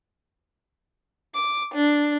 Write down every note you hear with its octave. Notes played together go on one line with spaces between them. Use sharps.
D6
D4